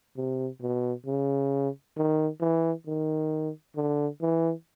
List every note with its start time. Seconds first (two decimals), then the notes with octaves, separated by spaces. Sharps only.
0.17 C3
0.62 B2
1.06 C#3
1.97 D#3
2.41 E3
2.87 D#3
3.76 D3
4.21 E3